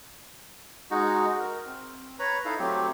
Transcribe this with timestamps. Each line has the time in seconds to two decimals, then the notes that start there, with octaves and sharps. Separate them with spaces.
0.91 G#3 D#4 F#4
1.40 A#4
1.66 C4
2.19 B4 C#5 A#5 B5
2.45 D#4 E4 A4 F5
2.59 F#3 A3 C4 G4